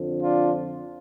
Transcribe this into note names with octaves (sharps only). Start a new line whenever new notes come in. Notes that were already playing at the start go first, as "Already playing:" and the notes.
Already playing: F2 D3 F3
D4 F4